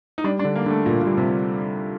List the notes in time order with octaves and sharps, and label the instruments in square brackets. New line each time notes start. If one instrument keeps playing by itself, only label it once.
[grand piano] D#4
[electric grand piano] G3 [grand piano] D4
[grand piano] D4
[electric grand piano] D3
[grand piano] A#3
[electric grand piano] D3 [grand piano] A3
[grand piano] A#2 [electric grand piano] F4
[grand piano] A#2
[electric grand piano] G3
[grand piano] C3